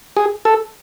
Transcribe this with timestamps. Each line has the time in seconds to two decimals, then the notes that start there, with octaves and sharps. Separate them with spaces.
0.17 G#4
0.45 A4